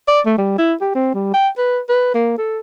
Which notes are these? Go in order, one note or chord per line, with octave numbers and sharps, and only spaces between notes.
D5
A3
G3
E4
G4
C4
G3
G5
B4
B4
A#3
A4